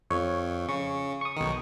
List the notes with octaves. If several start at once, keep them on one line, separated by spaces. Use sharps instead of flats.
F2 C#5
C#3 C#6
C#6 D#6
B1 D#3